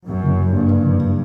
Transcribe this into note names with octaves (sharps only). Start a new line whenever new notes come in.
F#2
F#1
G2 A#3
F#1